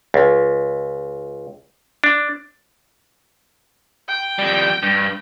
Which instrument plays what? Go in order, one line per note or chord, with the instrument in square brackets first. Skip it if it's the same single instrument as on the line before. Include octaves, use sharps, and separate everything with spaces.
[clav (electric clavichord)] C#2
D4
[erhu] G5
[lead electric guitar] F2 G3
G2